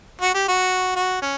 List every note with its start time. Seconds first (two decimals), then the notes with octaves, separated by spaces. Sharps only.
0.22 F#4
0.34 G4
0.48 F#4
0.96 F#4
1.22 C#4